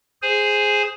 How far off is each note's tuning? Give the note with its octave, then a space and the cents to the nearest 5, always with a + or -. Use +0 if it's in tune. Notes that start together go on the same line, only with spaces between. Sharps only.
G#4 +0 C5 +0 G#5 +0